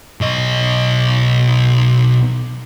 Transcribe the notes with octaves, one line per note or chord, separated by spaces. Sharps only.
B1 D#5